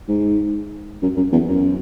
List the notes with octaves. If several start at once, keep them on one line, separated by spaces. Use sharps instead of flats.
G#2
F#2
F#2
E2
F#2